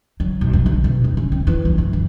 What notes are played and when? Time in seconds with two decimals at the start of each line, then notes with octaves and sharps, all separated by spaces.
0.20 F#3
0.41 B1
0.53 F#3
0.66 D3
0.84 B2
1.04 D#2
1.17 C#4
1.32 C4
1.47 E3
1.65 D2
1.78 G1
1.93 E3